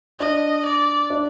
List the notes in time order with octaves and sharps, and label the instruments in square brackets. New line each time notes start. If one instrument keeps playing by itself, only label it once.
[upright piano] D4 [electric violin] D#5
[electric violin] D5
[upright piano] D4